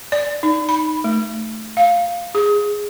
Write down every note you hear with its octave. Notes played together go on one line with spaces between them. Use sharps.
D5
D#4
B5
A3
F5
G#4